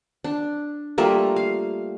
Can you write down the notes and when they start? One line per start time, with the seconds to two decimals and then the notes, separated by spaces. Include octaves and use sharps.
0.24 D4
0.98 G3 A3 A#3 F4
1.36 F5